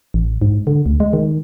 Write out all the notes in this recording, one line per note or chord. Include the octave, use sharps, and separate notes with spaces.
A1
G#2
D3
D2
G#3
D#3